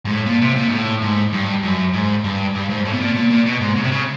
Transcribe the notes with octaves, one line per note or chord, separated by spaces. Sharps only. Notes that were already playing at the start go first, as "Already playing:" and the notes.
G#2
A2
A#2
C3
A#2
G#2
A2
G#2
G2
F#2
G#2
G2
G2
G#2
A2
B2
A#2
A#2
A#2
B2
G#2
C#3
C3
C#3